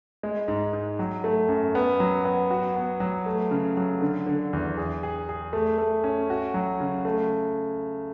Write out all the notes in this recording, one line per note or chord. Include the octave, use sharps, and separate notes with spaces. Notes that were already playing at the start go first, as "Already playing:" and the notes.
G#3
G#2
G#2
F#3
A3
F#2
B3
F#3
B3
F#4
B3
F#3
A3
C#3
F#3
D3
D3
E2
G#4
G#4
G#4
A3
A3
C#4
F#4
F#3
C#3
A3